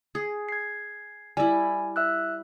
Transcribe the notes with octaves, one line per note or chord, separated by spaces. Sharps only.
G#4
G#6 C7
G3 E4 G#5
E5 E6 F#6